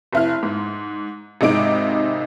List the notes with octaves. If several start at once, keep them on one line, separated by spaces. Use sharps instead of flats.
F1 E4 F6
G#2
G#1 C3 G#3 D#4 D6 D7